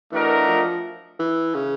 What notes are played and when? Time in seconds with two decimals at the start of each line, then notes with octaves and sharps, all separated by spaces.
0.11 E3 A3 D4 F#4 A#4 D#5
0.48 F3
1.19 E3
1.55 C#3